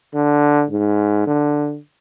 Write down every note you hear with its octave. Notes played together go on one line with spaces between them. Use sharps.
D3
G#2
D3